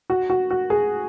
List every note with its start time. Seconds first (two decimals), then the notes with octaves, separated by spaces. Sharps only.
0.10 F#4
0.30 F#4
0.50 F#4
0.70 G#4